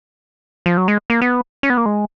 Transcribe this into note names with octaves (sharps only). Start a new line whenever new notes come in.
F3
F#3
G#3
A#3
B3
C#4
B3
A#3
G#3